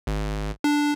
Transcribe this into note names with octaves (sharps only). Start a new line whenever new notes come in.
G#1
D4